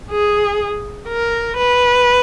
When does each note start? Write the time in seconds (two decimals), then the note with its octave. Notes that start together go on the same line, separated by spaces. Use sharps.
0.11 G#4
1.08 A#4
1.56 B4